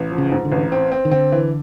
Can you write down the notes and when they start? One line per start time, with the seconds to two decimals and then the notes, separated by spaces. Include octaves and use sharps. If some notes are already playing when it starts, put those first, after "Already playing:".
Already playing: A1
0.11 F3
0.18 C#3
0.32 G#2
0.45 D3
0.52 A1
0.72 C4
0.92 C4
1.05 D#3
1.11 D3 C4
1.32 E3